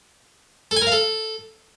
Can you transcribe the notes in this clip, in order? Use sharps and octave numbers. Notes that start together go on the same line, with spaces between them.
A4
G#5
A#4
F5
A4